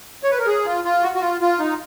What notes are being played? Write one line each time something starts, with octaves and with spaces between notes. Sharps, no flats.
C#5
B4
A#4
G#4
F4
F4
F#4
F#4
F4
F4
D#4